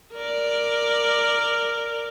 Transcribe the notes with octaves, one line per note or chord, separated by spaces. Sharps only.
A#4 D5